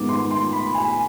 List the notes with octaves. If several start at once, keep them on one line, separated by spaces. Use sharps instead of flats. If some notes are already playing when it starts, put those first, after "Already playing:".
Already playing: G#2 D#3 B3 D6
C6
C6
B5
G#5